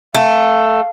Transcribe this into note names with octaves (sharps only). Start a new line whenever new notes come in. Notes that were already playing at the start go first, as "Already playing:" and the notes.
A3 F5